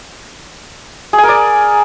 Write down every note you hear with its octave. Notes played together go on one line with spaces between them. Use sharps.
G#4
G#5
A#4
D5